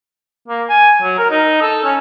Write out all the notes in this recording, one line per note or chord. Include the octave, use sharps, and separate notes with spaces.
A#3
G#5
F#3
A#4
D#4
A4
C#4